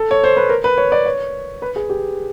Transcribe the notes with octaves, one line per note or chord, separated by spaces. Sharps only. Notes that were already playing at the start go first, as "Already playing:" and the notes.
Already playing: A4
C#5
C5
B4
A#4
B4
C#5
D5
C#5
B4
G#4
G4